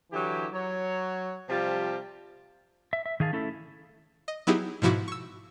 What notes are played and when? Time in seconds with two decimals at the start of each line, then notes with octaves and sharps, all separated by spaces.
0.12 D3 E3 F#3 E4 G4
0.53 F#3 C#5
1.49 C3 F3 G3 F4 G4 A5
2.93 E5
3.06 E5
3.20 D#3 G#4 F5 A5
3.33 A3 C#4 E4 A4
4.28 D#5
4.47 F#3 B3 D#4 E4 G4 G#4
4.82 G#2 B2 F3 E4 F#4 D6
5.08 C#6 E6